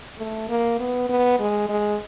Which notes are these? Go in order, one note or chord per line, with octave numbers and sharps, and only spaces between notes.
A3
A#3
B3
B3
G#3
G#3